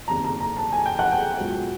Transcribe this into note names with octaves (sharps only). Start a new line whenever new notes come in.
F#1 E2 C3 D#3 A#5
A#5
A#5
A5
G#5
G5
F#5
G5
C#2 B2 F#3